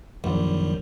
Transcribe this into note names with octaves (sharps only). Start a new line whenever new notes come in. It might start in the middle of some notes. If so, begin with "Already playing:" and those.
A#1 F#2 D#3 F#3 G3